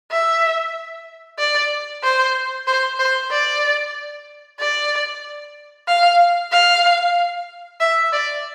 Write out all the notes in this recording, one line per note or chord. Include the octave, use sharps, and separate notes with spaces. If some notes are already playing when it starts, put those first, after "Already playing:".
E5
D5
C5
C5
C5
D5
D5
F5
F5
E5
D5